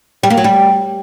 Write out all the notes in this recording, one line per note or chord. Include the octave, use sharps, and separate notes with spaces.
G3
A#3
F#3
G3